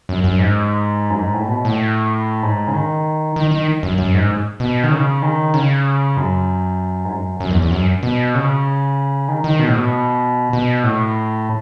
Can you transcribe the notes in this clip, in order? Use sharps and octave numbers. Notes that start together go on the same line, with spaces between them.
F#2
F#2
G#2
F#2
G#2
A2
B2
A2
G#2
C#3
D#3
D#3
D#3
F#2
F#2
G#2
B2
D#3
C#3
D#3
C#3
F#2
G#2
F#2
F#2
E2
E2
F#2
B2
C#3
D#3
D#3
B2
A2
B2
B2
A2